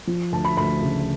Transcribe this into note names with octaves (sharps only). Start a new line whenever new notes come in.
F3
D2 A5
B5
D2 B5
C#3